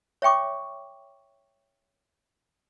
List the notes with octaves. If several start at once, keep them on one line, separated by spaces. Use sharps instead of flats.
C#5 E5 G5 C#6 D6